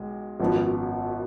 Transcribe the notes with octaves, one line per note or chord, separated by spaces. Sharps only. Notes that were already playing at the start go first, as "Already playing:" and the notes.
Already playing: B1 G#3
G#1 F#2 F3 B3